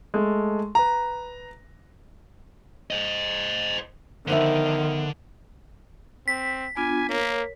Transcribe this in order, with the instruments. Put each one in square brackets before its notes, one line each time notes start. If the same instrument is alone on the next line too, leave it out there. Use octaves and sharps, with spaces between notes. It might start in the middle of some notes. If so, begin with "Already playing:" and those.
[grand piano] G#3 A3 A4
B4 A#5
[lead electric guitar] C5 D#5
[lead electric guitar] D3 [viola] D#3 [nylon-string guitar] F3 B3 E5
[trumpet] C4 [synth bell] B6
[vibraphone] B3 D4 F4 [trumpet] G#5
[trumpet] A#3 [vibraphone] A#4 C#5